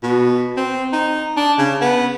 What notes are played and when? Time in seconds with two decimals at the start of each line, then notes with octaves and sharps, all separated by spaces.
0.03 B2
0.57 C4
0.93 D#4
1.37 D4
1.58 C#3
1.81 B3